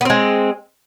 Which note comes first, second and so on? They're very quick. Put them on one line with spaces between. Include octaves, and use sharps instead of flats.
B3 C4 G#3